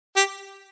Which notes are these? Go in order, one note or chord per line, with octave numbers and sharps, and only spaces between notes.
G4